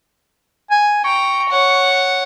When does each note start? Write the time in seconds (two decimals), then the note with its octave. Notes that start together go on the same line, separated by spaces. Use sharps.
0.71 G#5
1.04 G5 A#5 C#6
1.49 C#5 F#5